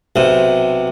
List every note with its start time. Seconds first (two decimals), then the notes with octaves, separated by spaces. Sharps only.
0.16 B1 C3